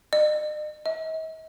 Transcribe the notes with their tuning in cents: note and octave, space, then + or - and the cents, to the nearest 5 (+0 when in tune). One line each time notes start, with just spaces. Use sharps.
D#5 -45
D#5 +45